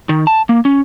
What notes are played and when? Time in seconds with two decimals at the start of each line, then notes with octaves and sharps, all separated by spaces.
0.09 D#3
0.27 A5
0.49 A#3
0.65 C#4